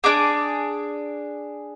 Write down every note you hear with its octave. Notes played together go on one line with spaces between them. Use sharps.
D4 G#4 D6